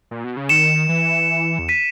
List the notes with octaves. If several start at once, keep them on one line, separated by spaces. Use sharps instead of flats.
A#2
B2
C#3
D#3 C#7 E7
E3
E2
B6 D#7